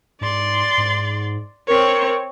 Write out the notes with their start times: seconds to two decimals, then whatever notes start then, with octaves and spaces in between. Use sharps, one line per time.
0.21 G#2 D5 C6
0.78 G#2
1.68 C4 A#4 C#5